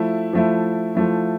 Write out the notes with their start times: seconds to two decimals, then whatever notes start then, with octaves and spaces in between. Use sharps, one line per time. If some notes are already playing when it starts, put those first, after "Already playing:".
Already playing: F3 A3 E4
0.33 F3 A3 E4
0.95 F3 A3 E4